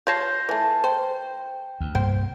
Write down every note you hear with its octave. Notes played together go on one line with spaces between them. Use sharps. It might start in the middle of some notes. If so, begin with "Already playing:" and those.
F4 C#5 A5 G6 A#6 C7
E3 A3 B4 G#5 A5
C5 G5
D2
C2 G2 A#3 C5 G5